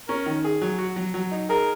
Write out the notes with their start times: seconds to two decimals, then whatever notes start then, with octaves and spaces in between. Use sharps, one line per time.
0.08 C#4 A#4
0.26 D#3
0.44 G#4
0.62 F#3
0.78 F#4
0.96 F#3
1.14 F#3
1.31 D#4
1.49 G#4 A#4